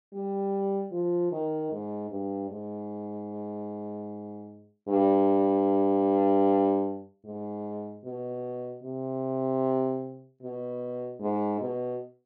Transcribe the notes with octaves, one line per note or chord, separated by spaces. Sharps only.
G3
F3
D#3
G#2
G2
G#2
G2
G#2
B2
C3
B2
G#2
B2